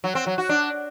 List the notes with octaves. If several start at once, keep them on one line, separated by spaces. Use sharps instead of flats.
F#3
C4
F#3
F#4
D4